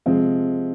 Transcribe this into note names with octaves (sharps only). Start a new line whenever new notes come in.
C3 F3 G#3 C4